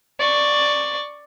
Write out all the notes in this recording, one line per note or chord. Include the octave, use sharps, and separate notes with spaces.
D5 C#6